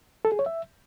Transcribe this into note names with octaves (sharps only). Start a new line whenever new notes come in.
A4
G#4
C#5
E5